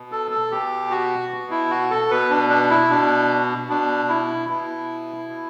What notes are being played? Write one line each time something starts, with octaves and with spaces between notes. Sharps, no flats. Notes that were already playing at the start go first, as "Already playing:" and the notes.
Already playing: B2
A4
A4
B2 G4
F#4
B2
E4
F#4
A4
B2 B4
D4
D4
E4
B2 D4
B2 D4
E4
B2 E4
B2